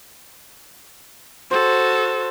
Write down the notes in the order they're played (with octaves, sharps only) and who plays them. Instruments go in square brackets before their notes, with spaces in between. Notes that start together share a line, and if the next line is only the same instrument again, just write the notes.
[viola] F#4 A4 [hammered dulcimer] C5